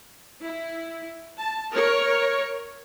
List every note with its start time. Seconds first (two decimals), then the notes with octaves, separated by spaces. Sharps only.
0.43 E4
1.38 A5
1.73 A#4 C#5